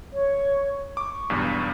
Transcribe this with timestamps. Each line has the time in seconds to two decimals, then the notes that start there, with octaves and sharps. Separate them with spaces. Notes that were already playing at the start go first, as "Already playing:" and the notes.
0.13 C#5
0.97 C#6 D6
1.30 B1 E2 G2